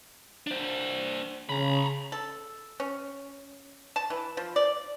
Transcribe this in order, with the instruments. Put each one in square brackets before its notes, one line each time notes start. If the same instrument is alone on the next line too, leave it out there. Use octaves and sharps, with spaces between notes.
[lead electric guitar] D4 C5
[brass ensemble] C#3 [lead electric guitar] A#5 B5
[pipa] A4
C#4
A5
E3
F3
D5